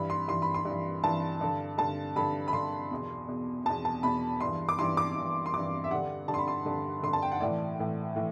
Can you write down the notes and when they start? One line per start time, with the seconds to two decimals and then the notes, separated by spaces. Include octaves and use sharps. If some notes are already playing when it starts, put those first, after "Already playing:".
Already playing: G2 E3 B5
0.10 C6
0.28 G2 E3 C6
0.42 B5
0.54 C6
0.65 G2 E3
1.03 G2 E3 A5
1.41 G2 D3
1.78 G2 D3 A5
2.16 G2 D3 B5
2.48 B5
2.53 G2 D3 C6
2.91 E2 B2
3.28 E2 B2
3.65 E2 B2 A5
3.85 A5
4.03 E2 B2 B5
4.40 G2 E3 C6
4.69 D6
4.79 G2 E3 C6
4.97 D6
5.16 G2 E3
5.46 C6
5.54 G2 E3 D6
5.84 E5
5.91 G2 D3 F#5
6.28 G2 D3 A5
6.34 C6
6.38 B5
6.48 C6
6.66 G2 D3
7.03 G2 D3 C6
7.13 A5
7.22 G5
7.32 F#5
7.40 A2 E3 D5
7.79 A2 E3
8.16 A2 E3